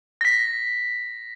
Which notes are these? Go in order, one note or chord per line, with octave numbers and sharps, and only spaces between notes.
A#6 B6